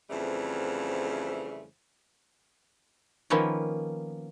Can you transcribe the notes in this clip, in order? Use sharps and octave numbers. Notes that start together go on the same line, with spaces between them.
F2 C#3 E3 G3 A3 C5
D#3 F3 A#3 B3 C#4